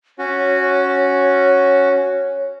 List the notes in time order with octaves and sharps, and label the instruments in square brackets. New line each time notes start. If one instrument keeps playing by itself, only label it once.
[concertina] C#4 F#4 [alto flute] C#5